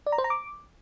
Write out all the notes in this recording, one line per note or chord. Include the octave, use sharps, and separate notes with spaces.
D5
A#5
C5
A#5
D6